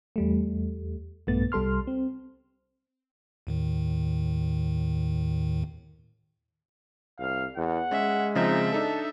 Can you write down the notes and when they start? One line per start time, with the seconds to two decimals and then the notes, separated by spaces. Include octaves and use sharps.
0.16 E2 G3 A3
1.27 A#1 G2 A3 B3 A6
1.52 C2 G3 A4 C6 F6
1.87 C4
3.47 D#2 A2 D#3
7.19 C2 F5
7.57 E2 F#5
7.91 G#3 C#4 E5
8.35 C#3 F3 C4 D#4 E5
8.72 D4 D#4 A4 A5